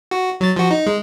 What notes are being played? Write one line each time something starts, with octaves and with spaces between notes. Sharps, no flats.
F#4
F#3 A6
F3 F#4
D#4
G#3